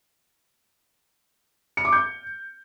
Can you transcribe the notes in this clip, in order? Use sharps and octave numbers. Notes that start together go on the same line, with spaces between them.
C#7
D6
G6